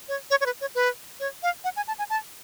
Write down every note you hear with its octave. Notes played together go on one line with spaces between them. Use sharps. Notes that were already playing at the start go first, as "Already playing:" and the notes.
C#5
C#5
C#5
B4
C#5
B4
C#5
F5
F#5
G#5
A5
G#5
A5